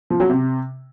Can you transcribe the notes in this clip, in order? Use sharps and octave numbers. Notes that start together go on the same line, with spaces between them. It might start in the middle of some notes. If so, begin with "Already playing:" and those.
F3
F#3
C3